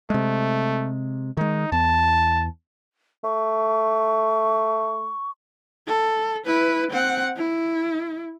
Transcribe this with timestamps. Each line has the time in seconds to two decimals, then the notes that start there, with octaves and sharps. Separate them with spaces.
0.10 C3 G#3 A3
1.37 D#3 G#3 D#4
1.72 E2 A5
3.24 A3 C#6
5.87 A4
6.46 E4 B4
6.91 C4 F#5
7.37 E4